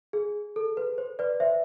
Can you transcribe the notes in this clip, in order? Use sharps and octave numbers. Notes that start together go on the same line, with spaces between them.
G#4
A4
B4
C5
B4 D5
C5 E5